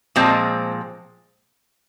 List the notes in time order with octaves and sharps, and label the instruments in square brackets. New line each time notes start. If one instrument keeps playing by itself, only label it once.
[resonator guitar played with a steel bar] A#2 F3 G#3 C4